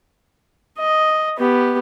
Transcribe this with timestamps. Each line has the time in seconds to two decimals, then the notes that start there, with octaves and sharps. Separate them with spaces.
0.78 D#5
1.38 B3 G4